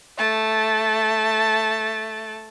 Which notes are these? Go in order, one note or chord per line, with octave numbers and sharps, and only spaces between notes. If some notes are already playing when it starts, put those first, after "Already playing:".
A3 A5